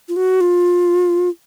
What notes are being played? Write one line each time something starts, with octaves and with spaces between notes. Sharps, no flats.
F4
F#4
F4